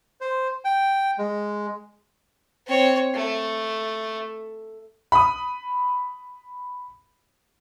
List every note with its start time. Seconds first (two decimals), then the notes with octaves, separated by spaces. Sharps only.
0.21 C5
0.65 G5
1.18 G#3
2.67 C4 C#5
3.14 A3
5.12 B5 D#6